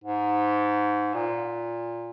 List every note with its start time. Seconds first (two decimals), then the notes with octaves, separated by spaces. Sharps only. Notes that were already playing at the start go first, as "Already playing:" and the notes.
0.04 G#2
1.14 A#2